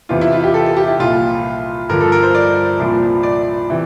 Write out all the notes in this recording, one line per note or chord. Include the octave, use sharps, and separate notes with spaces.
E2 C3 E3 F4
E4
F4
G4
A4
A4
G4
E4
C2 A#2 F3 F4
G2 D3 F3 A#4
A4
A#4
C5
D5
C2 A#2 F3
D5
C3 E3